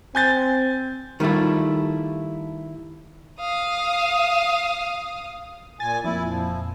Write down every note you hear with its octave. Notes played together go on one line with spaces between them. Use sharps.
C4 G#5 G6 A6
D#3 G3 A3 E4 F4
F5 D#6
A#2 G#5 A6
F2 A#2 E4
F3